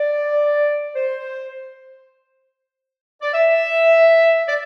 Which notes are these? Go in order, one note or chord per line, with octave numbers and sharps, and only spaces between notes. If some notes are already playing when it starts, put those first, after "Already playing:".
Already playing: D5
C5
D5
E5
D5